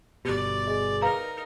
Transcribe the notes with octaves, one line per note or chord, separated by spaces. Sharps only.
G1 B2 G4 D5
G#4 D#5
D#4 A#4 B4 F5 A#5